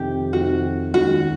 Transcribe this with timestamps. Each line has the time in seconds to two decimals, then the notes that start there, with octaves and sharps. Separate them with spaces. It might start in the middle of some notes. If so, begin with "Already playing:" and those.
Already playing: F2 C3 D#3 G4
0.33 F2 C3 D#3 F#4
0.94 D#2 D#3 G#3 C#4 F#4